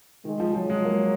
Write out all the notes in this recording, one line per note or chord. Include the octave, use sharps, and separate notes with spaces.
D#3 G#3
F3
F3 F#3
G#3
A#3